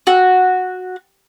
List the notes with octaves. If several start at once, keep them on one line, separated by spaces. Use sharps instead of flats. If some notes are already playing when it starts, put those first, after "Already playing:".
F#4